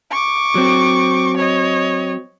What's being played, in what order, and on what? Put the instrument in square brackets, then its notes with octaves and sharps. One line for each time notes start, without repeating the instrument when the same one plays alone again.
[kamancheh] C#6 D6
[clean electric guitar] F#3 C4
[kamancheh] C#5 D#5